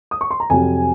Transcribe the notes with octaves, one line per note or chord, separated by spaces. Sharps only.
D#6
C#6
C6
A#5
F2 C3 F#3 G#5